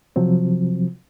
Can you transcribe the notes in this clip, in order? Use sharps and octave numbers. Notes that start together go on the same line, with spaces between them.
C3 F3 F#3 C4